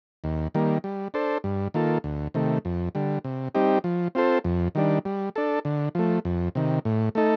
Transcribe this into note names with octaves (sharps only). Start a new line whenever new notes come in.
D#2
D#3 G3 A#3
G3
D4 A4 C5
G2
D#3 A#3 F4 A4
D2
C3 D#3 A3
F2
D3 G3
C3
G3 C4 D#4 G4
F3
C4 F4 A4 C5
F2
D#3 G3 D4
G3
D4 A4
D3
F3 A3
F2
C3 D#3
A2
A3 D#4 A4